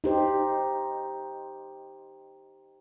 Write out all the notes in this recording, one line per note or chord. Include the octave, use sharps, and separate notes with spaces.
D#4 G4 C5